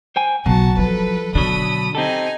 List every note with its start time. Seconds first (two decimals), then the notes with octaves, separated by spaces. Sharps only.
0.16 C5 G5 G#5
0.46 B1 F#3 F#4 A5
0.78 F3 A4 B4
1.35 B2 D3 F#3 D4 B5 D#6
1.95 C4 D#4 G4 A4 G#5